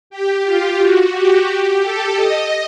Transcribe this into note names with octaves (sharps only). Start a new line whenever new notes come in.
G4
F4
F#4
G4
A4
D#5